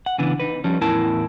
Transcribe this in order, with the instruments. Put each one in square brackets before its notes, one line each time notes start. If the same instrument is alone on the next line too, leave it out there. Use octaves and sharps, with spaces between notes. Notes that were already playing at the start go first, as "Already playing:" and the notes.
[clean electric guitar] F#5
C#3 E3 B3 D4
D#4 B4
F3 G3 C#4
E2 A2 E4 A#4 A5